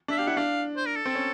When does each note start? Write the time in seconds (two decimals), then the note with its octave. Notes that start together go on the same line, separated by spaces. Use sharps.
0.08 D4 E5
0.18 G4 F5
0.27 E4 F#5
0.37 D4 F5
0.77 C5
0.86 A#4
0.96 A4
1.06 C4
1.15 C#4